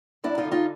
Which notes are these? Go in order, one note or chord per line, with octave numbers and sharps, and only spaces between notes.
F#2 D4 E4
D#4 F4
D3
D#4 F4